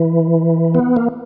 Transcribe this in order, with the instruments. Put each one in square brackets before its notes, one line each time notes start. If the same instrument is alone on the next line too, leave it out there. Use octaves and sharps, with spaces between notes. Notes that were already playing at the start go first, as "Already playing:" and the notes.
Already playing: [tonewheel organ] E3
B3
A#3